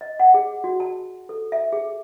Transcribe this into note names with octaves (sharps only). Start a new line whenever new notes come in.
D#5
F#5
G#4
F#4
A5
A4
E5
G#4